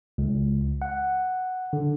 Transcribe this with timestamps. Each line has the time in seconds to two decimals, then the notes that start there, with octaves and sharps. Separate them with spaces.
0.18 C#2
0.82 F#5
1.73 D3